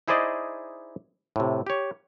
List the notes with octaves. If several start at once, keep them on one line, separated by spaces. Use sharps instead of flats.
D#4 E4 G#4 C5 D5 D#5
A2 C3
G4 C#5